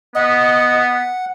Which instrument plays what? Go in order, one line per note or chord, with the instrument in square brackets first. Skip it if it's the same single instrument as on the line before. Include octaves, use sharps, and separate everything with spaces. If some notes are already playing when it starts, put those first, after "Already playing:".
[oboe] B3 [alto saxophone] D#5 [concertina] F#5